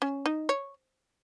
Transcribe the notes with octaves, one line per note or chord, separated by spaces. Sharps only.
C#4
D#4
C#5